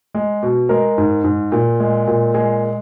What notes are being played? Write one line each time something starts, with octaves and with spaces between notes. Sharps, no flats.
G#3
B2
G#3 A#4
G#2
G#2
A#2
G#3
A#2
G#3 G#4